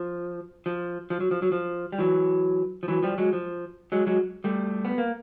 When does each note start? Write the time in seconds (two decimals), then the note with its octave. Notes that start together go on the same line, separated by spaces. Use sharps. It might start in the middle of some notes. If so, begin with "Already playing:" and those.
Already playing: F3
0.66 F3
1.10 F3
1.20 F#3
1.31 F3
1.42 F#3
1.52 F3
1.92 G3
1.98 E3 F#3
2.83 F3
2.88 E3 F#3
3.03 F3 G3
3.18 F#3 G#3
3.33 F3
3.92 F#3 G#3
4.07 F#3 G#3
4.44 G3 A3
4.85 B3
4.98 A#3